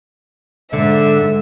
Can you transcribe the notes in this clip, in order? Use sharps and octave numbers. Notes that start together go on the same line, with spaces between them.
G#2 D3 E5